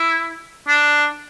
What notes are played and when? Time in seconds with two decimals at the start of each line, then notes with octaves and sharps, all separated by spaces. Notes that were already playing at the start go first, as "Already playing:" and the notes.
Already playing: E4
0.68 D4